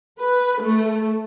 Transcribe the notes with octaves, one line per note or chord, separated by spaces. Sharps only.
B4
A3